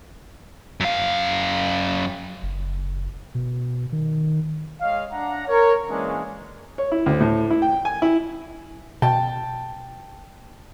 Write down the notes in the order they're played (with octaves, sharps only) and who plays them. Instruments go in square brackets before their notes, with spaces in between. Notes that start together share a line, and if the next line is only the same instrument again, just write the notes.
[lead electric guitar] F#2 F5
[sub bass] F#1
B2
D#3
[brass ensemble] G#3 C#5 D#5 F5
D4 F#5 A#5
A#4 C#5
E3 G#3 A#3 C#4 D4
[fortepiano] C#5
E4
D2
A2
E4
G5
G#5
E4
[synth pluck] B2 [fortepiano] G5 A5